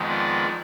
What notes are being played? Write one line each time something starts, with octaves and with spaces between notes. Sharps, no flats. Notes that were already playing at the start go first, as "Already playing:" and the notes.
Already playing: F2 D#3 G#3 B3
D5